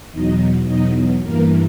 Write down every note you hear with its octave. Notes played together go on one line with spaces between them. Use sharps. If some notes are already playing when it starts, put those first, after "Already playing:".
E2 B2 F#3 D#4 D#5
E2 B2 F#3 D#4 D#5
G2 E3 A#3 A#4